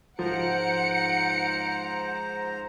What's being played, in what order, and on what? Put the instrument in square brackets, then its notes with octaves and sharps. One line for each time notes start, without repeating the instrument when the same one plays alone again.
[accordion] G#2 C5 A#5 [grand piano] F3 [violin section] F#5 C#7 D7